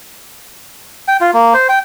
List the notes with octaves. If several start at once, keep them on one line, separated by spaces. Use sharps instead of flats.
G5
F4
A#3
C5
G5